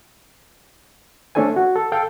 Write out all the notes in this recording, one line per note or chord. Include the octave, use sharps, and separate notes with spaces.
A3 C#4 D4 A4 C5 G#5
F#4
A4
A4 F5 G5